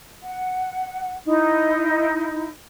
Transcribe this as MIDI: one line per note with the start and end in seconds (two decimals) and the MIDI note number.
0.24 1.16 78
1.26 2.49 63
1.26 2.49 64